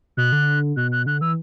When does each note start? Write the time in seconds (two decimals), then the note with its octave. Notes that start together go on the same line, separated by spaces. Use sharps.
0.17 B2 F#6
0.32 D3
0.76 B2 F#6
0.92 F#6
1.06 D3 F#6
1.21 E3 E6